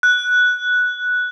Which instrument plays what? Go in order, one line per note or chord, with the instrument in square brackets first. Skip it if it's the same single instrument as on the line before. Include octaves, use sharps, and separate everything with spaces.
[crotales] F#6